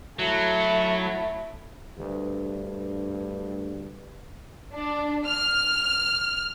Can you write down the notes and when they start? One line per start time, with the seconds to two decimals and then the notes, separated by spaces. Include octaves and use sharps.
0.19 F#3 A3 E4
1.98 D2 G2
4.73 D4
5.27 F6